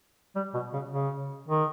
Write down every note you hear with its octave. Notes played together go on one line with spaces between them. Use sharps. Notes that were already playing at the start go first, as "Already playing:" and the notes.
G3
B2
C#3
C#3
D#3